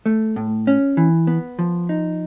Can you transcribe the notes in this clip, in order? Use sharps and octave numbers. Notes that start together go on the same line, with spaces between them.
A3
A2
C#4
E3
B3
F3
D#4